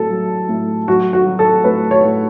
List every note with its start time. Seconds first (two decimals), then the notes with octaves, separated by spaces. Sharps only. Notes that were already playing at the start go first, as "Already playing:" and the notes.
Already playing: A2 F#3 A4
0.10 F#3
0.49 A2
0.88 F#3 F#4
1.13 F#4
1.26 F#3
1.39 A4
1.64 A2 B4
1.91 C#5
2.04 A2